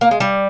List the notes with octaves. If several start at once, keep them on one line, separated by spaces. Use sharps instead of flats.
A#3
G#3
G3